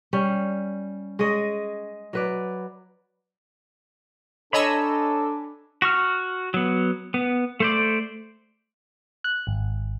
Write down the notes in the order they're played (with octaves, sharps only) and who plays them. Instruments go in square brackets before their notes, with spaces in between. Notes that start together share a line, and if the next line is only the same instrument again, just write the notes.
[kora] G3 C#4
G#3 G#4 C#5 D#5
F#3 B4 D5
[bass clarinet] D4 [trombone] A4 [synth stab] C#5 D#5 E6 [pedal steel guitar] G#5 A#5 B5
[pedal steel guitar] F#4 C#6 F6
F#3 B3
B3
A3 C5 D5
[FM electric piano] F#6
G#1